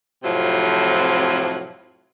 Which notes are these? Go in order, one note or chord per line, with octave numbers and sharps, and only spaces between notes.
F2 A2 C3 F3 F#3